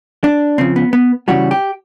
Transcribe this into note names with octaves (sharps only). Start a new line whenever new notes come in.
D4
C#3 F3 C4
B3
B3
C#3 E3 G3 F#4
G4